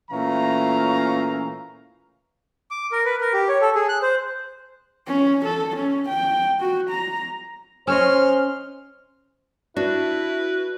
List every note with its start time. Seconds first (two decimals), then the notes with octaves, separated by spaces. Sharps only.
0.11 A#2 E3 A3 C#4 F5 A#5
2.71 D6
2.92 A#4
3.05 B4
3.21 A#4
3.33 G4
3.48 C#5
3.61 A4
3.75 G#4
3.89 F#6
4.02 C5
5.07 C#4
5.45 A4
5.77 C#4
6.09 G5
6.60 F#4
6.90 A#5
7.87 C#4 C5 C#5 D#5 C6 F6
9.77 D4 E4 F#4 B4